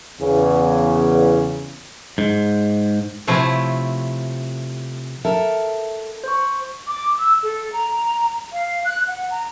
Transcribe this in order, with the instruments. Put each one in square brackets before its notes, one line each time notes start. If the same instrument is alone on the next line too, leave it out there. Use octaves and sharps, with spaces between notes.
[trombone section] E2 C#3
[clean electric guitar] G#2
[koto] C3 F3 A3 E4 C#5
[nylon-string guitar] A4 A#4 [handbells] E5
[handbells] C5 C#6
[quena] D6
E6
A4
A#5
F5
F#6
F#5
A#5